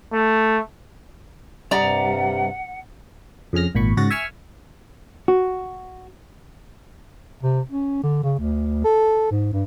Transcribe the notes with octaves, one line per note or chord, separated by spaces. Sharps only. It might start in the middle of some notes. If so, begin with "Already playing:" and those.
A3
G2 C3 G3 D5 F#5 A#5
F2 C#3 G#4 F6 A#6
G#1 A#2 B5 C#6
G#2 C#3 F#4 F#5 A6 A#6
E5 G#5 C#6 E6 F6
F#4
C3
C#4
D3
C#3
D2
A4
G#2
G2